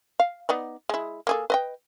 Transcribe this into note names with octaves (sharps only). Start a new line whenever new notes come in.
F5
B3 D#4 D5
G#3 E4
A#3 G#4 A4
B4 D#5 G5